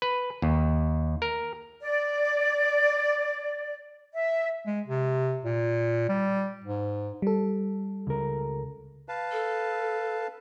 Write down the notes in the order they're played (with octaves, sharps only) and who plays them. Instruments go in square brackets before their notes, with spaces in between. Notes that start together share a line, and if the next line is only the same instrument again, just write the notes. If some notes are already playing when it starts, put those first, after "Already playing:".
[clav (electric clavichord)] B4
D#2
A#4
[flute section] D5
E5
[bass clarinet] G#3
C3
A#2
G3
G#2
[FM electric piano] G3 A4
[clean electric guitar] C#2 A#4
[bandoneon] B4 F5 A5
[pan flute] A4